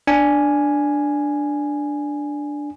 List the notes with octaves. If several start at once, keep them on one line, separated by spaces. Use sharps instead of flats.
D4 G#5